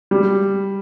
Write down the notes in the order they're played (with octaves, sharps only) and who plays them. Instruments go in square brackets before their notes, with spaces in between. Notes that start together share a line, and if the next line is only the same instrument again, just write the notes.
[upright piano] G3